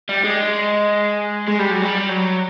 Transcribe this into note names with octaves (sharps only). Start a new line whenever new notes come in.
G3
G#3
G#3
G3
F#3
G3
F#3